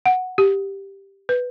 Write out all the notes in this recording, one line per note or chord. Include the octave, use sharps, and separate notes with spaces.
F#5
G4
B4